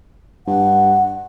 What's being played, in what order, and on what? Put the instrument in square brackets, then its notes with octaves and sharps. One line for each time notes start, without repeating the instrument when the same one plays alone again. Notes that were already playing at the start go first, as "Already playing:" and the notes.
[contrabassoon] G2 [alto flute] F#5